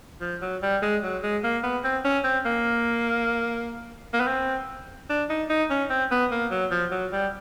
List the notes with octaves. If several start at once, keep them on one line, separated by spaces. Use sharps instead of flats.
F3
F#3
G3
G#3
F#3
G#3
A#3
B3
C4
C#4
C4
A#3
A#3
B3
C4
D4
D#4
D#4
C#4
C4
B3
A#3
F#3
F3
F#3
G3